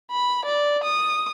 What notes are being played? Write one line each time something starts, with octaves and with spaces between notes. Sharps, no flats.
B5
D5
D#6